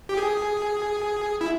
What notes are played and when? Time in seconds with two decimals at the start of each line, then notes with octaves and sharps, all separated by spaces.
0.09 G4
0.17 G#4
1.41 E4